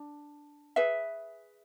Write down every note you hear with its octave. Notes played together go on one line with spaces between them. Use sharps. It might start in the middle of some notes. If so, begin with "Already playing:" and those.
Already playing: D4
G#4 B4 E5